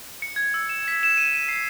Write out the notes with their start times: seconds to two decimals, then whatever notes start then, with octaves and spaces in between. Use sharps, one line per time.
0.22 C#7
0.36 G#6
0.54 E6
0.69 E7
0.88 B6
1.03 E7
1.17 D#7
1.35 D#7
1.49 C7